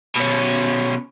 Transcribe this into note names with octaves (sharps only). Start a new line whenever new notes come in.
B2 C#4